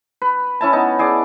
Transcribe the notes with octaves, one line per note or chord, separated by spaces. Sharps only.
B4
C#4 E4 A5
B3 D#4 A5
E4 G#4 D5